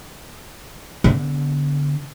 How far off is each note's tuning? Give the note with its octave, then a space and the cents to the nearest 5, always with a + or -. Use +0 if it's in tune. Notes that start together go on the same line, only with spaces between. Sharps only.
D3 -25 B3 +0